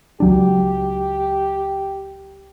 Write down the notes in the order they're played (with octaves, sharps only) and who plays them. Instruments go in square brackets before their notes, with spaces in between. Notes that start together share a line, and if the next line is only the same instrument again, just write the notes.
[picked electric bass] C#2 F#3 D4 [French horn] G4